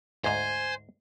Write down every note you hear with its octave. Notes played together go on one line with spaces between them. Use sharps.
D2 G#2 C5 G#5